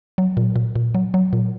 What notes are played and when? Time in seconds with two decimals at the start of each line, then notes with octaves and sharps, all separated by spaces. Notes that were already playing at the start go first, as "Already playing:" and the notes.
0.18 F#3
0.37 A#2
0.56 A#2
0.75 A#2
0.95 F#3
1.14 F#3
1.33 A#2